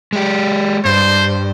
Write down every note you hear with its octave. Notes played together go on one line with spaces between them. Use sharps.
G#3 G4
G2 C5